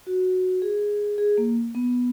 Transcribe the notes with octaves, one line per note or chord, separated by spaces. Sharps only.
F#4
G#4
G#4
A#3
B3